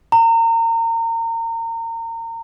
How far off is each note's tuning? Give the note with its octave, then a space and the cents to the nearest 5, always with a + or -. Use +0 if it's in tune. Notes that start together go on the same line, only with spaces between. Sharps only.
A#5 -30